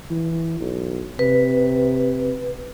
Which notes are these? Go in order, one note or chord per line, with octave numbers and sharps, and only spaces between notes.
E3
B1
C3 B4